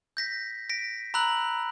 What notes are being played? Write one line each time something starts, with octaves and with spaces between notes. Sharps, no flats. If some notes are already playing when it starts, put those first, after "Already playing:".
G6 A#6 B6
A#6 B6 D7
A#5 B5 E6 F#6 F#7